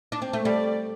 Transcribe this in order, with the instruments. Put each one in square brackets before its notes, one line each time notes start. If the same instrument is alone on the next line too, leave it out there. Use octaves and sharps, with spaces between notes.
[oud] D4
C4
A3
[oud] G3 [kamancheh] D5